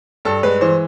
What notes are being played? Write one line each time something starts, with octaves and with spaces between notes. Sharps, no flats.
G2 A4
G#3 B4
E3 C5